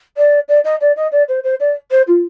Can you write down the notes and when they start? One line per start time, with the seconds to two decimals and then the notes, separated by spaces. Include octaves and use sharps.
0.17 D5
0.48 D5
0.64 D#5
0.81 D5
0.96 D#5
1.12 D5
1.28 C5
1.44 C5
1.60 D5
1.91 C5
2.07 F4